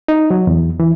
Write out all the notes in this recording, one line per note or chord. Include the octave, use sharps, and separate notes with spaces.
D#4
F#3
E2
E3